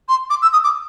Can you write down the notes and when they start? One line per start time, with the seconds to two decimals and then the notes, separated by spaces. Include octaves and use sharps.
0.08 C6
0.30 D6
0.42 E6
0.52 D#6
0.63 D6